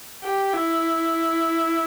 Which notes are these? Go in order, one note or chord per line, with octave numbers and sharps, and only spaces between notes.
G4
E4